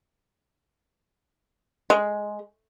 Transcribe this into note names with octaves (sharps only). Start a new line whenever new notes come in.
G#3